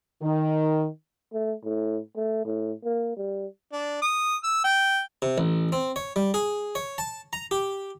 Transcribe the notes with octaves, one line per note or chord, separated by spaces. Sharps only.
D#3
A3
A2
A3
A2
A#3
G3
D4
D#6
E6
G5
C3
A1
C4
C#5
G3
G#4
C#5
A5
A#5
G4